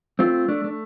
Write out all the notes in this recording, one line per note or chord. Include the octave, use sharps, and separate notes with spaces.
A3 C4 F4
A3 D4
A3